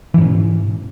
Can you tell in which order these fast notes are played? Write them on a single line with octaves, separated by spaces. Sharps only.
E3 G#2 C#4 B2